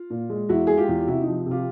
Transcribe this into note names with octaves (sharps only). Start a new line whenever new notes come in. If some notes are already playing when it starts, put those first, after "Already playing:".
Already playing: F4
A#2
G#3
E2 E4 F#4
G#3 G#4
F4 G4
E2
C3 E4 F#4
D#4
F3
C3
F4 G4